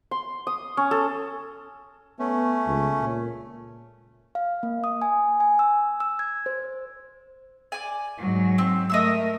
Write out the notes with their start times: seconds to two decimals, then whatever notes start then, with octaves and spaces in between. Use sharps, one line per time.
0.11 C6
0.47 D#6
0.77 C#4
0.91 A4
2.19 A3 B3 C#4
2.67 C#2
3.00 A#2
4.35 F5
4.63 A#3
4.84 D#6
5.02 G#5
5.40 G#5
5.59 E6
6.00 E6
6.19 G#6
6.46 C5
7.72 D5 G#5
8.18 G#2 F#3
8.58 C4
8.90 A3 A#4 D#5 E5 E6